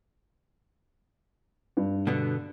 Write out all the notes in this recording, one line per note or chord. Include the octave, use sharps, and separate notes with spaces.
G2
B2 D3 B3